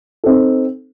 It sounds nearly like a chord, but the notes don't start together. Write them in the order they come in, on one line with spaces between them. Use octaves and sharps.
A4 C4 D#4